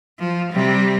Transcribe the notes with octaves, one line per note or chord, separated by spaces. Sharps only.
F3
C3 G3